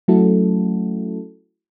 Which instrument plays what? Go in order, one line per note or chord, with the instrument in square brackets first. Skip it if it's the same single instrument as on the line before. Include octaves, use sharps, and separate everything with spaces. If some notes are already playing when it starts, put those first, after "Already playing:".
[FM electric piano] F#3 A3 C#4 E4 F#4 A4